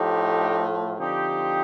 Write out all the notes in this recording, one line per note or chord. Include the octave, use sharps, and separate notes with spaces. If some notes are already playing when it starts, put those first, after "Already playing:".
Already playing: A2 F3 A3 D#4 G4
D3 F3 C4 D#4 G4